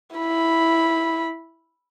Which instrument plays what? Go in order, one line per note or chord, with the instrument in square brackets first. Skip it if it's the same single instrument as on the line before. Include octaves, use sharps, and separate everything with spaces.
[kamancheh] E4 B5